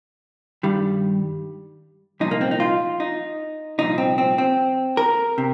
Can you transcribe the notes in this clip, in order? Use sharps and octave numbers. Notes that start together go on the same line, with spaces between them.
G2 D#3 G3
C2 A#2 F3 D#4
A#3
C4
D#4
F4
D#4
C2 A#2 F3 D#4
C4
C4
C4
A#4
C3